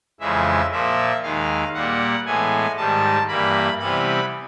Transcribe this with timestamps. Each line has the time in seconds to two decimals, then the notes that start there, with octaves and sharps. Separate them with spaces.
0.20 F2 C#3 E3 G#3 E5
0.72 A#2 F3 A#3 E5
1.23 D#2 D#3 G#3 F5
1.74 A#2 G3 A#3 F#5
2.25 A2 E3 G#3 B3 G#5
2.77 G#2 D#3 G3 A5
3.28 G2 E3 G3 A#3 B5
3.79 C3 E3 G3 B3 B5